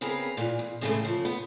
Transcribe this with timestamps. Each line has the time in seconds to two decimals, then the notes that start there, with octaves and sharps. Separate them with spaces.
0.01 C#3 B3 C4 G#4 A#4
0.37 A#2 E3
0.59 E2
0.81 A2 C#3 E3 F#3 G#3 A3
1.05 C#3 F3
1.25 B3